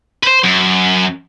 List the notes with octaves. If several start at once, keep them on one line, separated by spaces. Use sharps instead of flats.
B4 C5
F#2